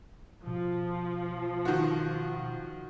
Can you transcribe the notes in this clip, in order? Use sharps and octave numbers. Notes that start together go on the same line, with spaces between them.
B2 F3
D#3 F#4